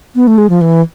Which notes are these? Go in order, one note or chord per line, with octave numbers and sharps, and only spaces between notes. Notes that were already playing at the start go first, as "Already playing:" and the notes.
B3
A3
G#3
F3
E3